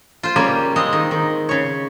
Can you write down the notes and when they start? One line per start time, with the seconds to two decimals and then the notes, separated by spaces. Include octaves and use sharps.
0.23 F4 C5
0.36 C#3 G3 A#3 C#4
0.76 G#3 C4 D#5
0.93 D#3
1.11 D#3
1.49 C#3 C#5